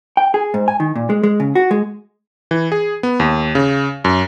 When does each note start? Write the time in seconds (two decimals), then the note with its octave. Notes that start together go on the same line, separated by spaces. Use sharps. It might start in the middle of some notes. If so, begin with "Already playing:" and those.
0.17 G5
0.34 G#4
0.54 G#2
0.68 G#5
0.80 D#3
0.96 A#2
1.10 G#3
1.23 G#3
1.40 C#3
1.55 F#4
1.71 G#3
2.51 E3
2.72 G#4
3.03 B3
3.20 D#2
3.55 C#3
4.05 F#2